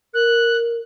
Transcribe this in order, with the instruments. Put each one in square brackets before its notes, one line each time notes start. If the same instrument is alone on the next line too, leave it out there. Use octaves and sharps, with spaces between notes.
[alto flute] A#4 [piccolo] F#6